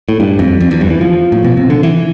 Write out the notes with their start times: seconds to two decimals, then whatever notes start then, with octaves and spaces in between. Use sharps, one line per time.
0.09 A2
0.20 G2
0.39 F2
0.61 F2
0.71 E2
0.81 G2
0.90 E3
1.01 F3
1.32 A2
1.45 B2
1.57 C3
1.70 D3
1.83 E3